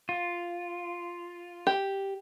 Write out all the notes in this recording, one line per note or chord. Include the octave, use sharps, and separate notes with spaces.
F4
G4